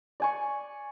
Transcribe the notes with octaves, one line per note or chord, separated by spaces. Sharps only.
D5 G#5 C#6